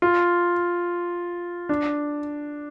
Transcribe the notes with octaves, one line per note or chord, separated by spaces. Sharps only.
F4
D4